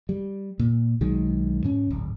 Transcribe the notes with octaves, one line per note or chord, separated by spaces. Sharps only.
G3
A#2
B1 D#3 F#3 G#3
G#2 C#4
D1 G#1